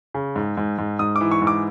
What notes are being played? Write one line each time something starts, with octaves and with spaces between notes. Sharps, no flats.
C#3
G#2
G#2
G#2
G#2 D#6
D6
E3
C#6
G#2
D6